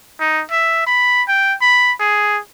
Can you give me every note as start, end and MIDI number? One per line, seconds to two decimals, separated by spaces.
0.20 0.42 63
0.51 0.84 76
0.87 1.23 83
1.29 1.55 79
1.62 1.92 83
2.00 2.39 68